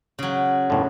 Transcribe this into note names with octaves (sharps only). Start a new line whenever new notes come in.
C#3 F#3
E2 A2 D3